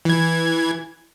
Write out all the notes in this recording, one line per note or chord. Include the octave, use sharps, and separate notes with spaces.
E3 G#6